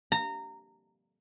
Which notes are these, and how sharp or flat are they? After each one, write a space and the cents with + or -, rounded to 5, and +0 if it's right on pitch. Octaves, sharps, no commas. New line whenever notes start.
A#5 -20